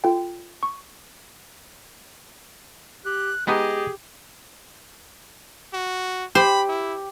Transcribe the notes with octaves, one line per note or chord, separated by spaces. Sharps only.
F4 A4 G5
C#6
G4 F#6
G#3 B3 D#4 G4 G#4 D#5
F#4
G4 C5 B5
E4